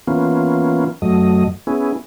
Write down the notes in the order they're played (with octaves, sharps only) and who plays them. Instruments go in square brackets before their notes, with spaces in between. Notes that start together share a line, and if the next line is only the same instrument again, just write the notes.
[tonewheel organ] E3 A#3 B3 C#4 F4
F#2 F#3 A3 D#5
B3 C#4 E4 G#4